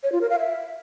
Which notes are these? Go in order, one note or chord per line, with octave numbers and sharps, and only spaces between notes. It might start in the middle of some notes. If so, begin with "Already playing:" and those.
C#5
F4
A#4
F5
E5